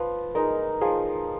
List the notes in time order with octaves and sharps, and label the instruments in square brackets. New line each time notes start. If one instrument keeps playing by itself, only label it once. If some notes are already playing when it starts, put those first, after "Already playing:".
Already playing: [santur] F3 [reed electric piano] B4
[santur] G#3 D#4 [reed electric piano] A#4
[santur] F3 [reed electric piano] G#4